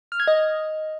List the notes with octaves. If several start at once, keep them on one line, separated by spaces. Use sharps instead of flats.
F6
G#6
D#5